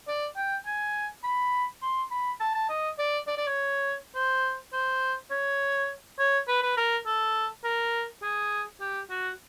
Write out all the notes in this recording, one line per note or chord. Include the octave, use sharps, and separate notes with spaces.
D5
G5
G#5
B5
C6
B5
A5
A5
D#5
D5
D5
D5
C#5
C5
C5
C#5
C#5
B4
B4
A#4
A4
A#4
G#4
G4
F#4